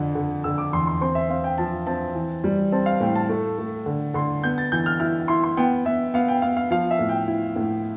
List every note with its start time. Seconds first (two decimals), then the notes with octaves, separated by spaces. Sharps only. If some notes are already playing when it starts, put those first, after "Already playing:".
Already playing: F2 D3
0.15 D3
0.44 D3 E6
0.58 D6
0.73 E2 C6
0.87 C6
1.01 C4 C6
1.15 E5
1.29 C4 F5
1.44 G5
1.58 F3 A5
1.87 C4 A5
2.15 E3
2.44 G3
2.72 C4 A5
2.86 F5
3.00 A2 G5
3.15 A5
3.29 A3
3.58 A3
3.86 D3
4.14 D3 C6
4.44 B3 G6
4.58 A6
4.72 E3 G6
4.86 F6
5.00 E4 F6
5.28 E4 C6
5.44 C6
5.57 B3 G5
5.85 B3 E5
6.14 B3 F5
6.28 G5
6.42 B3 F5
6.57 F5
6.71 F3 F5
6.91 E5
6.99 A2
7.09 G5
7.28 E4
7.56 A2